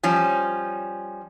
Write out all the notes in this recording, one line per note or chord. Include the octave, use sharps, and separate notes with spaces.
F3 G3 C#4